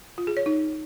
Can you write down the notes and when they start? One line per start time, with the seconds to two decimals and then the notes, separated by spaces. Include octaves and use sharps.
0.18 F4
0.27 G#4
0.37 C#5
0.46 D#4